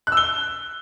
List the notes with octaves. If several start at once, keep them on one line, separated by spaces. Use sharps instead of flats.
F#6
E6
G7